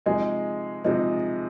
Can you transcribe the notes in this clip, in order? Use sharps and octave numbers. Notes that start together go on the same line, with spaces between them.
C3 F3 G#3 D#4 G#5
C3 F3 G#3 D#4